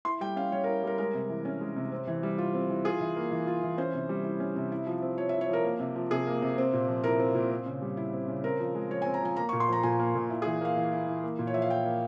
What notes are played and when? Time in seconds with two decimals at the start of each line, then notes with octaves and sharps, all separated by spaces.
0.05 E4 C6
0.21 G3 G5
0.36 C#4 F5
0.52 G3 C#5
0.64 A#4
0.67 E4
0.84 G3 A#4
0.98 G#3 A#4
1.14 C3
1.29 E3
1.45 C#4
1.61 G#3
1.76 C3
1.92 C4
2.07 E3
2.23 G3
2.38 F4
2.54 C4
2.70 E3
2.85 F4 G#4
3.00 E3
3.16 A#3
3.31 E3
3.47 F4
3.63 E3
3.78 C#4 C5
3.93 C3
4.09 G3
4.24 E4
4.40 C#4
4.56 C3
4.72 E4
4.87 F3
5.02 C4
5.18 F3 C#5
5.29 E5
5.33 E4
5.41 C#5
5.49 F3 A#4
5.64 A#3
5.80 C3
5.96 F3
6.11 C3 G#4
6.27 A#3
6.42 C3
6.58 C4
6.73 A#2
6.88 F3
7.04 E4 A#4
7.20 C4
7.35 A#2
7.51 C4
7.66 C#3
7.82 G3
7.97 E4
8.13 C4
8.28 C#3
8.44 C4 A#4
8.60 F3
8.75 G#3
8.90 F3 C#5
9.02 G#5
9.06 C4
9.14 A#5
9.22 F3 G#5
9.36 A#3 A#5
9.49 C#6
9.53 A#2
9.60 C6
9.68 F3 A#5
9.83 A#2 G#5
9.99 A#3
10.15 A#2
10.30 E4
10.42 G#4
10.46 E3
10.61 A#3 F5
10.77 E3
10.93 E4
11.07 E3
11.24 A#3
11.39 A#2
11.47 C#5
11.54 F3 E5
11.62 F5
11.70 E4 G5
11.85 A#3